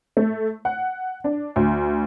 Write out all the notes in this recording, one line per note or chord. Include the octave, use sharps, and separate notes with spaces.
A3
F#5
D4
D2